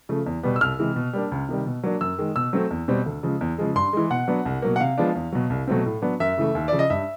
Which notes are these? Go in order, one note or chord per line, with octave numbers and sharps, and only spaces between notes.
C#3 F3 A3
E2
B2 G3 B3
E6
C2 F6
C3 E3 G#3
B2
G3 A#3 D4
C#2
C3 D#3 G3
B2
F#3 A#3 D4
F#2 E6
D#3 G#3
B2 E6
F#3 A3 C4
E2
B2 G3 C4
D2
C#3 F3 G#3
E2
C#3 F3 G#3
G2 C6
E3 G#3
B2 F#5
F#3 B3 D4
C2
B2 F#3 A#3
F#5
C3 F5
F3 G#3 B3 D4
E2
B2 F#3
C2
B2 F#3 A3 C4
A2
F#3 B3 D4
F#2 E5
C#3 E3 A3
D#2
C#3 F3 D5
D#5
G2 E5